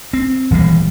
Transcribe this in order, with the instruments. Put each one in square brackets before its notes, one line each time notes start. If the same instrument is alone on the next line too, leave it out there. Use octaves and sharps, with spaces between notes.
[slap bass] C4
D#1 E3 G3 G#3